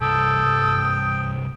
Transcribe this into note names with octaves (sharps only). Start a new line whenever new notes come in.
C2 G2 A4 G5 D#6